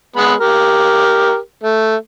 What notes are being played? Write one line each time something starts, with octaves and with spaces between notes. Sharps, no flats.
G#3 B3 B5
G4 A#4
A3